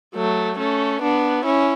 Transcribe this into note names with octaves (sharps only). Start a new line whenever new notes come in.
F#3 A3
A3 C#4
B3 D4
C#4 E4